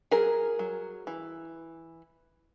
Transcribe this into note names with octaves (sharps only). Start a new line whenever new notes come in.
F#3 G#4 A#4
F#3
E3